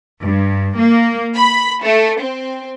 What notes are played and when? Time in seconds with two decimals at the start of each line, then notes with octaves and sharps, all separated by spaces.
0.23 G2
0.80 A#3
1.36 B5
1.84 A3
2.20 C4